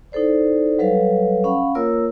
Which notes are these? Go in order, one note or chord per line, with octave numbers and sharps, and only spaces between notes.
D#4 E4 A4 C5 D5
F#3 G3 A4 B4 C#5 F5
C#4 F5 F#5 B5 C#6
A#3 F4 A#4 C#5 E6